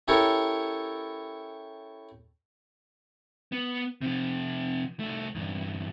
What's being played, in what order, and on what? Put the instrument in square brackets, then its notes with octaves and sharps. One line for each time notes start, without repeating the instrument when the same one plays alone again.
[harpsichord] C#4 E4 G4 A4 A#4 C#5
[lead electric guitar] B3
C3 F3
C2 A3
E2 G2